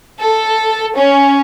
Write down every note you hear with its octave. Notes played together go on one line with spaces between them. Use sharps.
A4
C#4